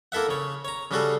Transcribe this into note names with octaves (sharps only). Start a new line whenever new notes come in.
A#3 E4 A4 E5 F#5
C#3 C#5
C#5 A#5
C#3 G3 C#4 F#4 G#4 A4